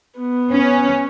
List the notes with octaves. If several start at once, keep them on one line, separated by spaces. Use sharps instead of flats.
B3
C#4